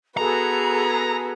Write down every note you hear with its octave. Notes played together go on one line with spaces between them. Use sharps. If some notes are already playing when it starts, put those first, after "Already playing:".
B3 F#4 G#4 A4 A#5